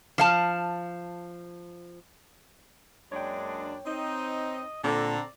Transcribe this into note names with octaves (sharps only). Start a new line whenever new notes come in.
F3 F5 A5
F#2 G#3 A#3 D4 C#5 G5
C4 D#4 D#5
A#2 D3 C4 A4 D5 A#5